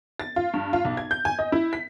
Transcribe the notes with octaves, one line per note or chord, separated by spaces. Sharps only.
A6
F4
G2
F4
B1
G#6
G6
G#5
D#5
E4
B6